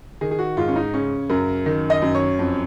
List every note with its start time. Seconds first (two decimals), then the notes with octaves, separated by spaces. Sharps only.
0.21 D#3 G#4
0.31 G#4
0.39 F#4
0.57 G#2 F4
0.68 C#4
0.76 D#4
0.94 C#3 C#4
1.30 F#2 A#4
1.66 D#3
1.90 D#5
2.02 F#2
2.15 C#5
2.39 F2